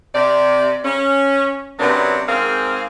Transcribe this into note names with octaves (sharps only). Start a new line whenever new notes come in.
C3 D5
C#4
C3 F#3 A#3 B3 C#4 D4
G#2 C4 G#4 A#4 C5 F5